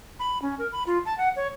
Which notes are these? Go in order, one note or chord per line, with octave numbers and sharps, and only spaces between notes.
B5
C#4
A#4
B5
F4
A5
F#5
C#5